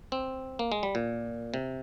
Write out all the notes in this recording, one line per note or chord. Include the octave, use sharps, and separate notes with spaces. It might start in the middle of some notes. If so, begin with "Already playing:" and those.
C4
A#3
G#3
G3
A#2
C3